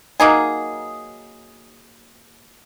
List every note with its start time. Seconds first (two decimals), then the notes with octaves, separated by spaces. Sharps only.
0.20 F#3 A#3 D#4 G#4